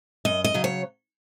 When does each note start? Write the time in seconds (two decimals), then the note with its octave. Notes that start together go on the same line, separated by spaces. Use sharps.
0.25 F#2 D#5
0.44 D#5
0.54 C#3 F#3
0.64 C#5